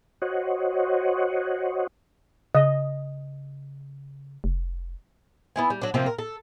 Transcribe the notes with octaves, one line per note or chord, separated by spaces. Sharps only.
F#4 C5 C#5 D#5 F#5
C#3 D#5
F1
B3 E4 G#5
G3
F#3 D4
C3 F3 A#3 C4
A#4
A4